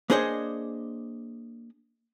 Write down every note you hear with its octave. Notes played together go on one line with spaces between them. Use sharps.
A#3 D4 G#4 C5 C#5 D#5